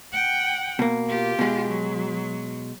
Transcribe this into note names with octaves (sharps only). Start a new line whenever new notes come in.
F#5 G5
B2 A#3
F4 G4
B2 G#3
F#3